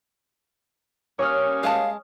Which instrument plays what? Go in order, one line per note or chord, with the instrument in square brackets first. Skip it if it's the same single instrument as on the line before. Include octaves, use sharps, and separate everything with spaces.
[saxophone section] G3 A#3 C#4 [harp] C#5 D#6 F6
[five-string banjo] G#3 A5 [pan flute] F5